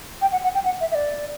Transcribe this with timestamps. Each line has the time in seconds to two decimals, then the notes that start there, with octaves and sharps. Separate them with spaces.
0.21 G5
0.32 F#5
0.44 F#5
0.54 G5
0.65 F#5
0.81 E5
0.91 E5
0.95 D5